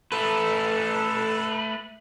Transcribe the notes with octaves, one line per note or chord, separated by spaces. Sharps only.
A3 A4 B4